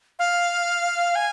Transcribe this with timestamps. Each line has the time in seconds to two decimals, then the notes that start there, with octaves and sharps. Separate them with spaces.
0.19 F5
1.15 G#5